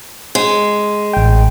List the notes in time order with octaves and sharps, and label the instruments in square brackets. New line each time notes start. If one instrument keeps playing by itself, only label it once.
[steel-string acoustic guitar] G#3
[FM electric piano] A1 G5